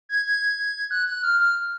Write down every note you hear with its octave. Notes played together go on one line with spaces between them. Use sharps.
G#6
G#6
F#6
F#6
F6
F6